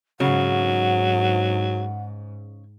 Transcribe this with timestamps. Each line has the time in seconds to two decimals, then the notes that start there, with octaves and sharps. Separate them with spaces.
0.20 G#2 C#3 F#3 F#5